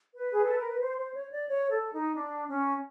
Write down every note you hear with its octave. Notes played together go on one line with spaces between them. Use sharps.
B4
G#4
A4
A#4
B4
C5
C5
C#5
D5
C#5
A4
D#4
D4
C#4